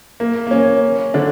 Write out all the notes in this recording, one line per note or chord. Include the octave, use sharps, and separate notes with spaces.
A#3
A#3
C#4
D3 D4